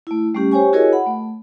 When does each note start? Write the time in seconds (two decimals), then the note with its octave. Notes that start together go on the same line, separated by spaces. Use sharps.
0.07 A3 E4
0.35 G3 A3 C#4 G4
0.51 G4 C5 C#5 G5 G#5 C#6
0.73 E4 F#4 G#4 A#4 C#5 D#5
0.93 F#5 B5
1.06 A3